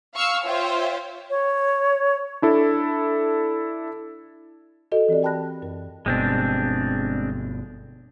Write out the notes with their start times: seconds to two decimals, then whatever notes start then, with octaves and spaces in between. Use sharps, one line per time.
0.14 F5 C#6 E6 F6 C7
0.46 F4 C5 C#5 E5 F5 G5
1.30 C#5
2.42 D4 E4 A4
4.92 F#4 A4 D#5
5.09 E3 C4 G4 D5
5.23 A#4 G5 A5 B5 F#6 A#6
5.62 F#2 A#4
6.06 G1 B2 G#3 C4 D4